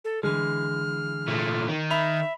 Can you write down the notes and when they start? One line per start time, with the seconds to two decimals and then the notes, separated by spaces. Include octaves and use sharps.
0.05 A4
0.23 D3 E3 G#3 F6
1.28 A#2 A3
1.69 D#3
1.90 E5 B5 F7